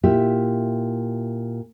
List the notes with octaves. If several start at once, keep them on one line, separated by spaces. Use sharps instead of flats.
A#2 E4 G4 E5